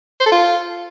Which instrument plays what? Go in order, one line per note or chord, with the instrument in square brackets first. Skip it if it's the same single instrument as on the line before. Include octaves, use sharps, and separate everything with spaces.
[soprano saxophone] C5
A4
F4